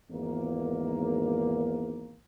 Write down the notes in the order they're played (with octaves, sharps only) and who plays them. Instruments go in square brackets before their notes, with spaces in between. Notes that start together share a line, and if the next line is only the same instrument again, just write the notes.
[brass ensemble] G#1 E2 A#3